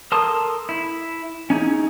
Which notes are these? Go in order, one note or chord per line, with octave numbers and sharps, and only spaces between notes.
A4 A#4 A5 C6 D#6
E4
C#4 D#4 E4 G#4